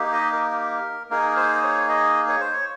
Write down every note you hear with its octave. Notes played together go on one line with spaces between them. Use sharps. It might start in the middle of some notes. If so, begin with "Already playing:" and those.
Already playing: A#3 D#4 G4
D#5
A#4
A#3 D#4 G#4 A#4
C5
C#5
D#5
C#5
C5
C#5